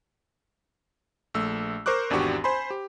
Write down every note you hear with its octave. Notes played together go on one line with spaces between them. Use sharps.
A#1 A3 E6
A#4 C5 C#6 D6 F#6
G#1 E2 D4 F#4 G4 C#6
C5 G#5 B5 C6
G4